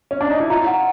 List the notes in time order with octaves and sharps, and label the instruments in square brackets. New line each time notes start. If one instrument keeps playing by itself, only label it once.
[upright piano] C#4
D4
D#4
E4
[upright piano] F4 [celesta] A#5
[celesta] F#5